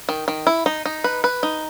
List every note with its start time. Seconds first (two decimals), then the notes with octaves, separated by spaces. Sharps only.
0.09 D#3
0.28 D#3
0.47 E4
0.66 D#4
0.85 D#4
1.04 B4
1.24 B4
1.43 D#4